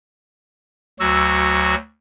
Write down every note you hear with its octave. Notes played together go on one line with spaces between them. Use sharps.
D2 F#3 F#4 E6